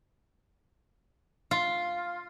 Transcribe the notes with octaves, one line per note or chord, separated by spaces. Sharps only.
F4